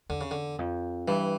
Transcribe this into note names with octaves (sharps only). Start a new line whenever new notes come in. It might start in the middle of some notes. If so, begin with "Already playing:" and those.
E2 D3
C#3
D3
F2
G2 E3